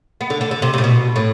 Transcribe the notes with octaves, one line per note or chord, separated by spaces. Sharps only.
B3
D3
D3
D3
C3
C3
A2
B2
A2